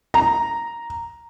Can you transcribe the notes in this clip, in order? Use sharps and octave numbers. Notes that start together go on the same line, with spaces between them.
A#5